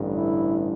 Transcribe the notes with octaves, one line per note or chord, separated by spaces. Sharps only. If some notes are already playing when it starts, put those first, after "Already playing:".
Already playing: A1 G2 D3
E4